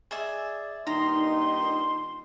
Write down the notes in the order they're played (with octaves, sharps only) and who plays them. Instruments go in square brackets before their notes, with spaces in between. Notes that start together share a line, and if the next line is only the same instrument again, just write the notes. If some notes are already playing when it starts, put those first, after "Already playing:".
[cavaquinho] G#4 D5 E5
[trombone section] G2 A#2 D#3 [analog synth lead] D#4 [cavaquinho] A#5 [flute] C6